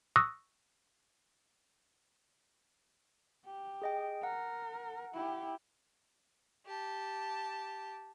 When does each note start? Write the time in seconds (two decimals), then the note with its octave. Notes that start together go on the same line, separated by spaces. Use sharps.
0.16 C#6 D#6 E6 F#6 A#6
3.46 G4
3.82 G#4 D#5 G5
4.23 A#4 F#5
5.15 E4 G4
6.66 G4 A5